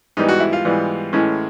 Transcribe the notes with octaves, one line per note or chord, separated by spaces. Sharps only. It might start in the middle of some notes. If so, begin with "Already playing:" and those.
G#2 E3 G3 B3 D#4
F#4
E4
F4
G#2 E3 G3 B3
A2 E3 G#3 C#4